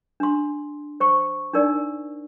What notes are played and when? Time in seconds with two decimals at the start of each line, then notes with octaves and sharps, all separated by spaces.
0.20 D4 C6
1.00 C5 C#6
1.53 D4 D#4 A#4 D5